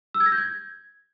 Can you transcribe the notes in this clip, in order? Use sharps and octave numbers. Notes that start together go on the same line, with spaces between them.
E6
G#6
A#6
G6
G#6